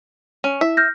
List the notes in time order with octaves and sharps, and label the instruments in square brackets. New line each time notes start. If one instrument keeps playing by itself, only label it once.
[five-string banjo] C#4
[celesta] E4 [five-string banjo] E5
[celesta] F6 G6 A#6